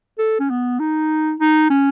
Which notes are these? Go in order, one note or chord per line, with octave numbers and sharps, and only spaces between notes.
A4
C#4
B3
D#4
D#4
C#4